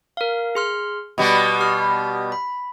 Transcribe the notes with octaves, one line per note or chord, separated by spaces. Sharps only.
A#4 F5
G#4 C6 F6
B2 G3 B3 B5
G4 F6
B5